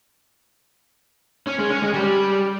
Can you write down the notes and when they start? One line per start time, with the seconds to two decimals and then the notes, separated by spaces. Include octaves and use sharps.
1.47 C#4
1.59 G#3
1.70 C#4
1.82 G#3
1.94 G3